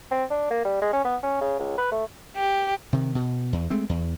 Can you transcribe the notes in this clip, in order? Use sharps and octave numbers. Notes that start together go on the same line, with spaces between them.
C4
D4
A#3
G3
G#3
C#4
B3
C#4
C#3
C#2
B4
A3
G4
C3 D#3
B2
E2
G#3 A3 C4
E2